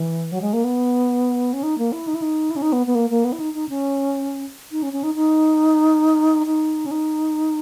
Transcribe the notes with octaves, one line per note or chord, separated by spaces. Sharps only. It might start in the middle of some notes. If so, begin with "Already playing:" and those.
Already playing: E3
F#3
G#3
A#3
B3
C#4
D#4
A#3
E4
D#4
E4
D#4
E4
C#4
D#4
B3
B3
A#3
A#3
B3
E4
D#4
D#4
C#4
D#4
C#4
C#4
D#4
D#4
D#4
C#4
D#4